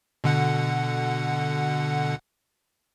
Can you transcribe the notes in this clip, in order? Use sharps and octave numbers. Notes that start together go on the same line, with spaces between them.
B2 D3 F#5